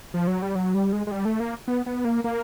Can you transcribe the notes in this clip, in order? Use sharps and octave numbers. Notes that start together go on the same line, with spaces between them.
F3
F#3
G3
F#3
G3
G#3
G#3
G3
A3
A#3
B3
B3
A#3
A#3